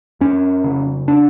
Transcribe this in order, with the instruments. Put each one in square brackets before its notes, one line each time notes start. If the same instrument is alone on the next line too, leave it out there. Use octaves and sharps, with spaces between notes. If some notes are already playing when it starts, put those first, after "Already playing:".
[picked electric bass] F2 C#4
C#3
D4